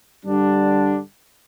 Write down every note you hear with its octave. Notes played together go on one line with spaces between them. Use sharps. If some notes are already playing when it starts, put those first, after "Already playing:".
G2 D3 G3 D4